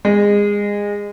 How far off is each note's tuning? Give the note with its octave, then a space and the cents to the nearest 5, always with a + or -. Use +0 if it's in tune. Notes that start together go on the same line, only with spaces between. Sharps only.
G#3 -25